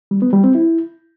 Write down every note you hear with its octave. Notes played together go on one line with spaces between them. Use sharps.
G3
B3
G3
C4
E4